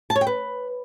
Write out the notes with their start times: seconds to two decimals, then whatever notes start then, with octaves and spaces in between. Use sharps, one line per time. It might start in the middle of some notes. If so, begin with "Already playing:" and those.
0.10 A5
0.16 C#5
0.21 G5
0.27 B4